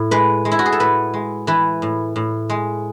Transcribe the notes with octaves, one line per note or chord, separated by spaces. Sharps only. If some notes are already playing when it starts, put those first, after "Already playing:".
Already playing: A2
G#3 B4
G#3
E4
F#4
G#4
A4
A2 B4
G#3
E3 B4
A2
A2
G#3